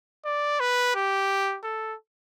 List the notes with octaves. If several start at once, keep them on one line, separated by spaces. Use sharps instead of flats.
D5
B4
G4
A4